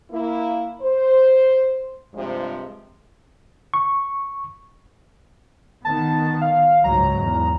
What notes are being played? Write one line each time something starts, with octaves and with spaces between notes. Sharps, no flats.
A#3 E4
C5
G2 C3 F3 G#3
C#6
D#3 B3 A5
F5
C#2 G#2 F#3 A#5
E2